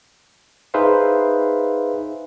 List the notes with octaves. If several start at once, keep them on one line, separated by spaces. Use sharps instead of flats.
D#4 G#4 B4 C5 E5 F5